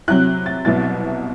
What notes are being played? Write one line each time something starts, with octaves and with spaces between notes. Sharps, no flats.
C3 F#3 C4 E4 F#6
A6
C2 B2 F#3 C4 E4 A6